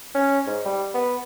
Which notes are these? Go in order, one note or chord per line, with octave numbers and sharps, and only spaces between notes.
C#4
G#2
G3
B3